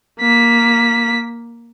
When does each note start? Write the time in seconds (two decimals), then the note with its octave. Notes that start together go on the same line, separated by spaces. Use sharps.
0.20 A#3 B6